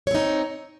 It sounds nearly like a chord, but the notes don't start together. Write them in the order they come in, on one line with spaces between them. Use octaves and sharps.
C#5 C4 D#4